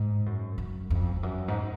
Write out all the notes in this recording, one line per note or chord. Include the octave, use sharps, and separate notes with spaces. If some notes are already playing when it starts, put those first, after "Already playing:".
Already playing: G#2
F#2
F#2
F2
F2
F#2
G#2